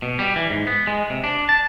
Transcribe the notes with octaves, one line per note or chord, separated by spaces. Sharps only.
B2
G3
E3
G#2
B3
G#3
C3
D4
A5